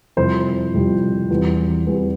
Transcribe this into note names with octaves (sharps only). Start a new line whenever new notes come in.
F2 C3 G3 C4 E4 C5
F2 C3 G3 C4 E4
E2 E3 G3 C4
E2 E3 G3 C4